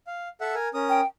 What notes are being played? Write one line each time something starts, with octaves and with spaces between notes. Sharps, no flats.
F5
A4 E5 F#5
A#4 G#5
C#4 A#4 D#6
G5